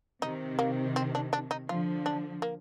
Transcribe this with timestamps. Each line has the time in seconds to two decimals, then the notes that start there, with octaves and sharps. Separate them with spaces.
0.22 C3 D#3 D#4
0.59 A#3
0.96 C4
1.15 D4
1.33 D4
1.51 D#4
1.69 D3 F3 F4
2.06 D4
2.42 A#3